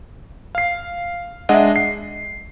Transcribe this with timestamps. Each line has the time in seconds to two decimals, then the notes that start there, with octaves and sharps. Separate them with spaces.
0.55 F5 C7
1.49 G#3 D4 D#5 E5 F#5
1.76 C7